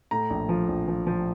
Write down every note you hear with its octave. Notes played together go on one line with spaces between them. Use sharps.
A2 A#5
A#1
F3
A#1
F3
F3